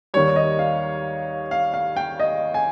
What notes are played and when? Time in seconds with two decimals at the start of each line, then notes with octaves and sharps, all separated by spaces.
0.14 D#2 D#3 G3 C#5
0.36 D#5
0.59 F5
1.51 F5
1.74 F5
1.96 G5
2.20 D#5
2.54 G#5